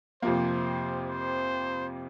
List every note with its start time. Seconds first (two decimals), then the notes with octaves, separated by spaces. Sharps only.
0.22 F2 C3 F3 A#3 C5
1.09 C5